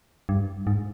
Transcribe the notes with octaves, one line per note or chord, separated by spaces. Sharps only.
G2
G#2